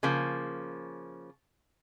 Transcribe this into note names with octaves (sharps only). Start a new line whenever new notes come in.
C#3 F3 A#3